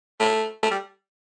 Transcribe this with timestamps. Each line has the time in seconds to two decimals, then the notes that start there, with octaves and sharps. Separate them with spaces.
0.20 A3
0.63 A3
0.71 G3